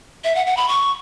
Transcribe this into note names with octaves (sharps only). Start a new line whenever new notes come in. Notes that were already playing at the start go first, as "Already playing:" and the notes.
E5
F#5
F#5
B5
C#6